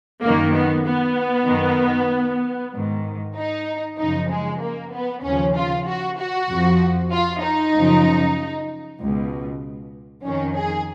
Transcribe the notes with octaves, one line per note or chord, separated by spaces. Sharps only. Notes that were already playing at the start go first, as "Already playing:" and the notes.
F#2 D#3 A#3
B3
B3
F#2 D#3
G#2 D#3
D#4
F#2 C#3 F3 D#4
G#3
A#3
B3
D#2 C#3 F3 C#4
F4
F#4
F#4
F2 F3
F4
D#4
F#2 C#3 F3
C#2 B2
F2 D#3 C#4
G#4